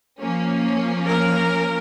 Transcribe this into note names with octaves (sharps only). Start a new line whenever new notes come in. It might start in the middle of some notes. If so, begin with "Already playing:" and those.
F3 A#3 C#4
A#4